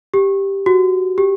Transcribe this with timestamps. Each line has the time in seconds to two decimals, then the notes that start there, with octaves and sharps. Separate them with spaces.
0.14 G4
0.66 F#4
1.18 G4